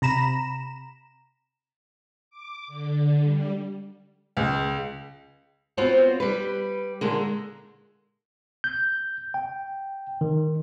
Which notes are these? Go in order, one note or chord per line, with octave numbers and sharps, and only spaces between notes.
C3 A#5 B5 E7
D6
D3
G3
C#2
B3 C4 F4 F#4 C5 C#5
G3 B4
A#2 D3 G#3 A#3
G6
G5
D#3